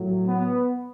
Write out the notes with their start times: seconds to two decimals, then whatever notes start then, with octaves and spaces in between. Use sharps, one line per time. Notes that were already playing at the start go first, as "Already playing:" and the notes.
Already playing: A2 F#3
0.26 B3